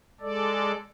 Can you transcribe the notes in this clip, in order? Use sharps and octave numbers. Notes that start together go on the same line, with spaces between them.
G#3 A4 D5